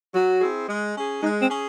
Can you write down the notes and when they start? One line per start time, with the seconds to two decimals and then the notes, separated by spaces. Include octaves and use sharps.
0.15 F#3 F#4
0.42 C4 E4 G#4
0.69 G#3
0.96 C#4 G#4
1.23 G#3 D#4
1.41 C4
1.50 C#4 G#4